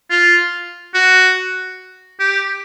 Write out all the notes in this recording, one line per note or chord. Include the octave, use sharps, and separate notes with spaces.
F4
F#4
G4